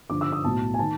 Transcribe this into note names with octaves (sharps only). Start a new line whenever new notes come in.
G2 D3 F3 D6
E6
D#6
B1 A2 F#3 A5
G#5
D#3 A5